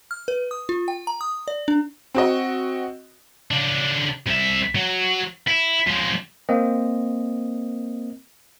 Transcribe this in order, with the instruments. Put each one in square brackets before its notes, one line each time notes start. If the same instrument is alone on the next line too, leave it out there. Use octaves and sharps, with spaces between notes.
[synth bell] F6
B4
D#6
F4
G5
A#5
D#6
D5
D4
[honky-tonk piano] C4 F#4 D#5
[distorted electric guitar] C#3 D4
C2 E5
F#3
E4
F3 G#3
[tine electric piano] A#3 C4 D#5